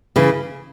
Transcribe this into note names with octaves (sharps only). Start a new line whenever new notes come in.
C#3 E3